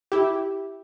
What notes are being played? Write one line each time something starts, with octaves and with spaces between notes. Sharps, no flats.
E4 G4